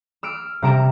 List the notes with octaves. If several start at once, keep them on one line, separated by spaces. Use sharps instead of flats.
E6 F6 D7
C3 G3 A#5 D7 E7